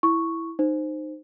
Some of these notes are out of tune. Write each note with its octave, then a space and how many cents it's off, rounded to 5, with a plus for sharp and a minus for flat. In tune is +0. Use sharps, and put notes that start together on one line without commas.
E4 +0 C#6 +0
D#4 -20 C5 +0